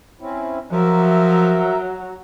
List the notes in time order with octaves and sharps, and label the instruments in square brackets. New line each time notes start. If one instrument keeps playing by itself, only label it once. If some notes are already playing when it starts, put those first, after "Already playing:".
[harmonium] C4 C#4 E4
[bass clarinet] F3 [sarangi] F#3 [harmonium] A#4 E5